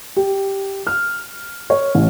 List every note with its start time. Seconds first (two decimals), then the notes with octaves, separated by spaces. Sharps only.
0.16 G4
0.87 F6
1.70 C#5
1.95 A1